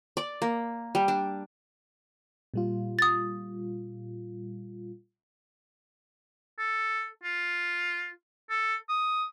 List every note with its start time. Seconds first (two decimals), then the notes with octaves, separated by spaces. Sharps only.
0.17 D5
0.42 A#3
0.95 G3
1.08 D4
2.54 A#2 G3 F4
2.99 D#6 A6
6.58 A4
7.23 F4
8.50 A4
8.89 D#6